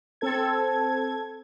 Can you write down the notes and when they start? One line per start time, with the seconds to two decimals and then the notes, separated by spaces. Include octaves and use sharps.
0.21 C4 A4 G#6